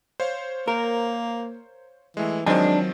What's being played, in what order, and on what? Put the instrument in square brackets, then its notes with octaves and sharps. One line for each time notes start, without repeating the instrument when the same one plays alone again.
[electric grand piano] C5 C#5 F5
[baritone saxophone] A#3 [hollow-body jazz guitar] A#4
[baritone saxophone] E3 [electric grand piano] G#3 A3
[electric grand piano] D#3 F3 C4 [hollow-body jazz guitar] F#3 G#5 [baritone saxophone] G#3 [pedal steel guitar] D4